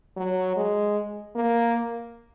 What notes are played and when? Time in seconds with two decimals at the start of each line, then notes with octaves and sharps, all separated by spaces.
0.17 F#3
0.56 G#3
1.35 A#3